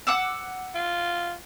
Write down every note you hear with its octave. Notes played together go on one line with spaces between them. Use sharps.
F#5 D6 E6
F4